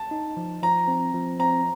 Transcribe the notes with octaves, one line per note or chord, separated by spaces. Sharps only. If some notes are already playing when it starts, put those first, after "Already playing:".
Already playing: A5
D#4
F3
F3 A#5
C4
F3
C4 A#5